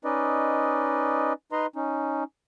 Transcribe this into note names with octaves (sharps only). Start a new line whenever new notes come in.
C#4 D#4 B4 D5 D#5
D#4 B4 D#5 A#5 C6
C#4 D#4